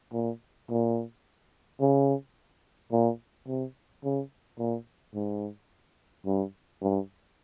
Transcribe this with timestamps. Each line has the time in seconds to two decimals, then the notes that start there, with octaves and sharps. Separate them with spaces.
0.13 A#2
0.69 A#2
1.81 C#3
2.92 A#2
3.47 C3
4.04 C#3
4.59 A#2
5.15 G#2
6.26 G2
6.82 G2